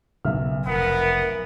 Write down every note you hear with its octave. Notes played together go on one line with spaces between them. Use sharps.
B1 C#3 B3 E5 F6
F1 F2 B3 A#4